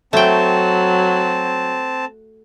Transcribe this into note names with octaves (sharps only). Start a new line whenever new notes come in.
F#3 A3 C4 G5 A5